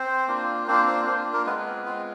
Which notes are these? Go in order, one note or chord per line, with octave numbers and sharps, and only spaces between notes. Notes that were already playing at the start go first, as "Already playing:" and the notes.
Already playing: C4 C5
A#3 D4 F4
A#3 C4 D4 F4 C5
C4 C5
A#3 C4 D4 F4 C5
A#3 A#4
G#3 B3 C4 F4 B4
G#3 C4 F4